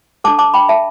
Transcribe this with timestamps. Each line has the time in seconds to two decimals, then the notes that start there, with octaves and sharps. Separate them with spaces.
0.24 D4 A4 A5 D6
0.39 A5 D6
0.54 G5 B5
0.69 E5 A5